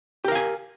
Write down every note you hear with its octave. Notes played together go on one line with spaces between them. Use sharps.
G4 A#4 F5 G#5